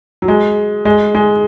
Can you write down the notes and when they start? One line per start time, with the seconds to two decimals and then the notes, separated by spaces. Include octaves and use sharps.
0.22 F#3
0.28 G#3
0.85 G#3
1.15 G#3